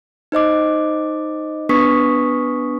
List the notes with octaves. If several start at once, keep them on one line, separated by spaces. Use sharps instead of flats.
D#4 C5 D#5 D6
B3 D4 B4 C#6 D#6 B6